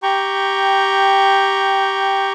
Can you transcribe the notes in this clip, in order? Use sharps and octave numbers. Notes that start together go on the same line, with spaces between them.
G4 G5 A#5 C#6